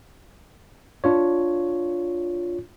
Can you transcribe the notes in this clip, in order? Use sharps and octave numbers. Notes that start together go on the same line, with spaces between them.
D4 F4 C#5